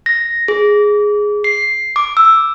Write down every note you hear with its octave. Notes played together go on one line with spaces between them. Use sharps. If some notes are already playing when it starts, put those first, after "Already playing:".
A#6
G#4
C7
D6
E6